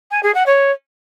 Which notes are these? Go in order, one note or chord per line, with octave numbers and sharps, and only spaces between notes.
G#5
G#4
F#5
C#5